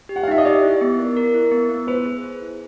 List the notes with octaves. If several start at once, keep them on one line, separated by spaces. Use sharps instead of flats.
G4
F#5
F5
D#4 E5
D#5
G4 D5
E4
B3
A#4
A#4
E4
B3
B3
B4 C5
G#4
G#4
E4